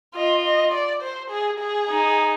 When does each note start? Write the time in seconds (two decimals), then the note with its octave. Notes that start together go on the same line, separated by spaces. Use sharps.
0.15 F4 D#5
0.44 D#5
0.73 D5
1.02 C5
1.30 G#4
1.59 G#4
1.89 D#4